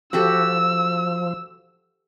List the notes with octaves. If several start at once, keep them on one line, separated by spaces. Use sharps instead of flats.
F3 F#4 G4 A4 E6